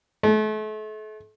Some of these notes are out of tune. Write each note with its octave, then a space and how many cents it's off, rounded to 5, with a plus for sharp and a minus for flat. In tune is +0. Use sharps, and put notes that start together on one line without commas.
A3 -40